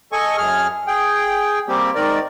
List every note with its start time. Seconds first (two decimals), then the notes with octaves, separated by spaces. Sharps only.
0.12 A4 D#5 G#5 C#6
0.37 F#2 G#4 F6
0.87 G#4 G5
1.68 G3 A#3 C4 G4
1.95 G#2 D#3 A#4 D5